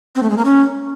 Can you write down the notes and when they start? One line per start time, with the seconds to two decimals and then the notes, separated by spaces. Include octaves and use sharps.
0.16 C4
0.23 A3
0.30 G#3
0.37 A#3
0.45 C#4